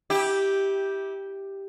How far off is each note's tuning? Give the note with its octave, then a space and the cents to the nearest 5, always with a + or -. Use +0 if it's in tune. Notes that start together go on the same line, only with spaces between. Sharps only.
E4 -30 G4 +0